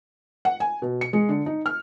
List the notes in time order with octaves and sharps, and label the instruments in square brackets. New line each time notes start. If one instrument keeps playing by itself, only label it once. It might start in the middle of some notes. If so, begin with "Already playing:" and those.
[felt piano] F#5
G#5
B2
C#7
G#3
D3
D#4
F6